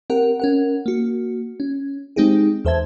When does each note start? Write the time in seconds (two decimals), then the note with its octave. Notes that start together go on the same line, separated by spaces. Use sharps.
0.10 C4 G4 A#4 F#5
0.40 C#4 A#4 F#5
0.86 A#3 F#4
1.60 C#4
2.16 G#3 C4 D#4 G4 G#4
2.65 E2 A4 C5 E5 A5 G#6